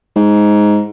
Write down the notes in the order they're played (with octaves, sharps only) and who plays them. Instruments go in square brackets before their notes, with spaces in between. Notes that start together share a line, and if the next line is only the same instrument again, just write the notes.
[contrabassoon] G#2